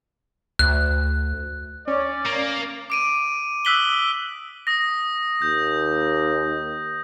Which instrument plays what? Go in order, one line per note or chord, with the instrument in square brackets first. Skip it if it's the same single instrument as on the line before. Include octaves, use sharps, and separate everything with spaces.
[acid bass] D2 [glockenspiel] F#6
[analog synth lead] C#4 [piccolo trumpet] D5
[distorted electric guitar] A#3
[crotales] D6 D7 D#7
D#6 E6 F#6 B6 F#7 G7
D#6 A#6
[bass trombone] D#2 [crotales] G6